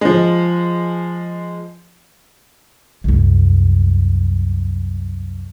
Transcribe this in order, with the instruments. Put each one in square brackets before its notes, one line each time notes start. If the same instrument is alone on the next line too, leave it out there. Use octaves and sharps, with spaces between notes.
[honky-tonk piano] F3 G#3
[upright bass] C2 F#2